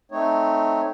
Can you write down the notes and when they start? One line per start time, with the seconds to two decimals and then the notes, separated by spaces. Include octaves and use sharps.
0.12 A3 C4 D#4 C#5